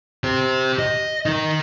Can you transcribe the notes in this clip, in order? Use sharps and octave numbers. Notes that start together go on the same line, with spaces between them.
G4 C5
D#5
D#4 A#4